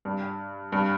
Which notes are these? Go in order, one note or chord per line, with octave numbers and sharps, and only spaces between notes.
G2
G2